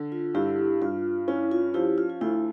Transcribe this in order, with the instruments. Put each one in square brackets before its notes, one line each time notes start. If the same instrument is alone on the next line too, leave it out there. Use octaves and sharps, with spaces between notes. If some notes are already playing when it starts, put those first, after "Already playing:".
Already playing: [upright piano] D3
[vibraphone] F4
[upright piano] G2 [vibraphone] E4 G4
[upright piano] G2 [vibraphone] F4
[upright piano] C#4 [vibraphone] E4
[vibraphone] F4
[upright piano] F3 [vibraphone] E4 G4
[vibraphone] F4
F4
[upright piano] D2 [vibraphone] E4